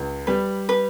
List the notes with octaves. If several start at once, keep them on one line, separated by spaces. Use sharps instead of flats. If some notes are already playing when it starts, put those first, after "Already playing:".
Already playing: C#2
G3 B4
B4